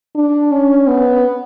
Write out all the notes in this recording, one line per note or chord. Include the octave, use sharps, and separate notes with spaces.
D4
C#4
B3